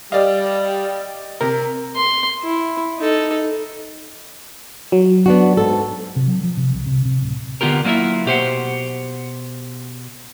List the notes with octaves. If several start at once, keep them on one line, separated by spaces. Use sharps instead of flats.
G3 D5 D#5 F5
C3 A#4
C6
E4
D#4 A4
F#3
B3 D4 F#4
G#2 A4
C3
F#3
F3
C3
C2
C3
C3
D1
D3 B3 F4 G4 A#4
F#3 A#3 C#4 E4 F4 E5
B2 G4 C5 F#5